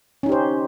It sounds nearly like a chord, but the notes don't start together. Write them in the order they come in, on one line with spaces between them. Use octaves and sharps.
C#4 D#4 G4 C5